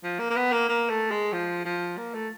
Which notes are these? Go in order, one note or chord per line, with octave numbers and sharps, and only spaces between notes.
F3
A#3
A#3
B3
A#3
A#3
A3
G#3
F3
F3
A#3
A3